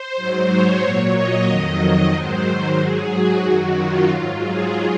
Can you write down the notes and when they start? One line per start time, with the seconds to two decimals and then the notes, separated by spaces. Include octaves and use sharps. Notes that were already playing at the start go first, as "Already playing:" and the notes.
Already playing: C5
0.16 G#2 F#3
0.49 C#5
0.81 A#2 F#3
1.15 D#5
1.47 F2 D#3 F#3
2.13 G#2 D#3 F#3 C5
2.79 G#2 F#3 G#4
3.11 F#4
3.44 F#2 D#3 F#3
3.77 F4
4.09 G#2 F#3
4.42 G#4